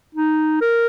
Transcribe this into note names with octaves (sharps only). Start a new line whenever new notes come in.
D#4
A#4